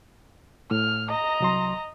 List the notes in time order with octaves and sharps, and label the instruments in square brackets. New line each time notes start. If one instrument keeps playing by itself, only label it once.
[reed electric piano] A2 [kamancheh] F6
[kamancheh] D#5 A#5
[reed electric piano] C2 F#3 C6